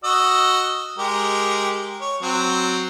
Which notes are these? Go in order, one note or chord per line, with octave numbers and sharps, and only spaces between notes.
F#4 D#5 E6
G#3 G4 A#4
C#5
F#3 C4